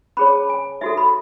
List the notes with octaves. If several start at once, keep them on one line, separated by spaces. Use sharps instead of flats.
C#4 G#4 C#5 B5
A5
G#5
D#4 F#4 A4 E5
B5